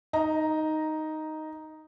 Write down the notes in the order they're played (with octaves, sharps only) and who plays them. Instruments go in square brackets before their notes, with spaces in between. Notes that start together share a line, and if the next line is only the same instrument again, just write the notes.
[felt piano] D#4 A#5